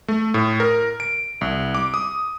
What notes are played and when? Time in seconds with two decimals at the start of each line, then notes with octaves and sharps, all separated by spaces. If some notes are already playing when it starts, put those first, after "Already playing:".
0.08 A3
0.34 A2
0.60 A#4
1.00 D7
1.41 C2
1.75 D6
1.94 D#6